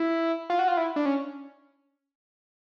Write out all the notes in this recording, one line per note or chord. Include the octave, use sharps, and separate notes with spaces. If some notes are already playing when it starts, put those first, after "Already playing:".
Already playing: E4
F4
F#4
F4
E4
D4
C#4